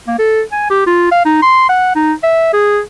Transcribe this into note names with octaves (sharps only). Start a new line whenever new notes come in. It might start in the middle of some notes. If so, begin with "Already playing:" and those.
A#3
A4
G#5
G4
F4
F5
D#4
C6
F#5
D#4
E5
G#4